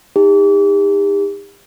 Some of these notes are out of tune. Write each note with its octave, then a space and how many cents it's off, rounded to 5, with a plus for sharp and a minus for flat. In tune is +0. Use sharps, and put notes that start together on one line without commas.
D#4 +15 G4 +40